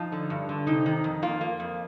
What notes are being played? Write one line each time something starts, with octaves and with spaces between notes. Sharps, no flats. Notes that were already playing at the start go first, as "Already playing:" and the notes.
Already playing: F3 D#4
D3
G2
D3
C3 D#4
D#3
F2
A#3 F4
A#3
F2